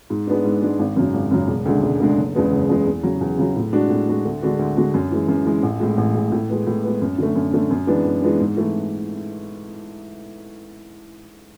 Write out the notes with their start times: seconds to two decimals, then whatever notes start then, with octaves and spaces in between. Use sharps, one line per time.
0.10 G#2
0.27 G#3 B3 D4
0.45 G#2
0.61 G#3 B3 D4
0.79 G#1
0.96 F#2 C#3 F#3
1.14 G#1
1.31 F#2 C#3 F#3
1.48 E1
1.65 D2 C#3 G#3 D4
1.83 E1
2.00 D2 C#3 G#3 D4
2.17 F#1
2.35 E2 C#3 G#3 B3
2.52 F#1
2.69 E2 C#3 G#3 B3
2.86 E2
3.03 C#3 F#3
3.21 E2
3.38 C#3 F#3
3.56 A2
3.73 G#3 D4 F#4
3.90 A2
4.08 G#3 D4 F#4
4.25 D2
4.42 D3 G#3 D4 F#4
4.59 D2
4.76 D3 G#3 D4 F#4
4.94 F#2
5.11 E3 G#3
5.28 F#2
5.45 E3 G#3
5.63 A1
5.80 A2 G#3
5.97 A1
6.15 A2 G#3
6.32 A2
6.50 G#3 B3
6.67 A2
6.84 G#3 B3
7.01 F#2
7.18 D3 A3
7.35 F#2
7.53 D3 A3
7.70 F#2
7.87 E3 G#3 B3 D4
8.05 F#2
8.22 E3 G#3 B3 D4
8.40 G#2
8.57 E3 A3 E4